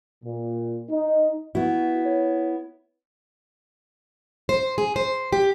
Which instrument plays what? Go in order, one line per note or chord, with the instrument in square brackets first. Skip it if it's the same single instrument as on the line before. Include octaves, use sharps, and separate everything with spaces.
[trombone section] A#2
D#4
[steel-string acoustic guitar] B3 E4 [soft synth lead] F#4
[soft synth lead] C#5
[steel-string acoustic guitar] C5
G#4
C5
G4